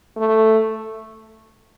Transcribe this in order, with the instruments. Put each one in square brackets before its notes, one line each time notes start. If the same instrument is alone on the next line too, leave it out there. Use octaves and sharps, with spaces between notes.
[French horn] A3